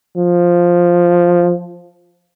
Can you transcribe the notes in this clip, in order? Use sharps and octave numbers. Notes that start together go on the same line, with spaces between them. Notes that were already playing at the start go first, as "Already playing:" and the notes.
F3